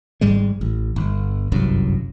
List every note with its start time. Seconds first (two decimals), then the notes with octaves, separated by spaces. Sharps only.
0.21 G#1 G#2 G3 G#3
0.61 A1
0.96 G1
1.52 G1 C2 F#2